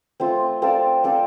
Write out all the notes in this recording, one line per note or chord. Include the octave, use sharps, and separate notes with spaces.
A3 C4 F4
C4 A4 D5 F5
C4 A4 D5 F5